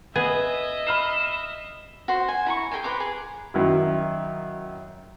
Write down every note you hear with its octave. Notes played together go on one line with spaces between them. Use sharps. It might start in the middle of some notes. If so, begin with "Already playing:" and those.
B3 G#4 D#5 E5
B5 F6 C7 E7
F#4 C5
G#5
E4 A#5 C#6
G#4 B4 G5 G#5
B4 C5 A#5 D6
G#4
F#2 D#3 E4